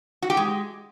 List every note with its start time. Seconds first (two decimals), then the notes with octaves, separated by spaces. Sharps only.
0.22 F#4
0.30 G4
0.37 G#3